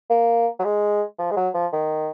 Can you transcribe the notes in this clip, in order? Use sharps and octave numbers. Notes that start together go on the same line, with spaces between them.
A#3
F#3
G#3
F3
G#3
F#3
F3
D#3